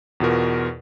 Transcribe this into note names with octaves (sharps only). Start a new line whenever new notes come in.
E2 B2 F4 A#4